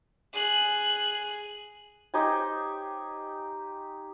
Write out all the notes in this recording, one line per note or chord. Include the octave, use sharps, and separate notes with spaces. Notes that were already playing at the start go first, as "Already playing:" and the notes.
G#4 F#6
D#4 G4 C5 G#5